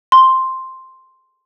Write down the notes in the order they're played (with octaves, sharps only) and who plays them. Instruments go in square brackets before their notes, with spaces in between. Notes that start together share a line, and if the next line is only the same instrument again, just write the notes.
[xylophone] C6